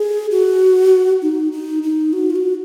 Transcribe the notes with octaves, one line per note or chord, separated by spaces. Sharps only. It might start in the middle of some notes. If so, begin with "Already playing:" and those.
Already playing: G#4
F#4
D#4
D#4
D#4
F#4
F4
F#4